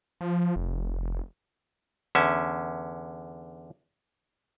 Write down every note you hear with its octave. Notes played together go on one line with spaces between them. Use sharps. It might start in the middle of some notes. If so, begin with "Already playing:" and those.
F3
F1
E2 D3 C#4 E5